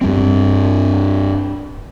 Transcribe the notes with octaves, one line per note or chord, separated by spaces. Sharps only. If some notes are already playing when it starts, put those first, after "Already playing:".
G2 G3 C4